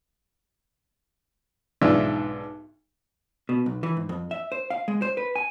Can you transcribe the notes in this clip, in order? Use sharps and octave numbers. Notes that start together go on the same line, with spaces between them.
B1 G#2 D4 F4 E5 E6
B2
B1
E3
G#2
F2
E5
C5
F5
G#3
C5
B4
G#5